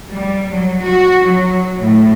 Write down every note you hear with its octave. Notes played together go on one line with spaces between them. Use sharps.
G3
F#3
F#4
F#3
A2